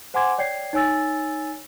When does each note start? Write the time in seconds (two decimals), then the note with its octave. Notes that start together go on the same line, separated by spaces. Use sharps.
0.14 C5 F#5 G#5 C6 D6 G#6
0.38 C#5 D5 G5 G#6 C7
0.73 D#4 C#5 G#5 E6 A6